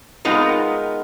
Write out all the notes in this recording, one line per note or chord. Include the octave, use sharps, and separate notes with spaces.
G#3 B3 D#4 F4 A#4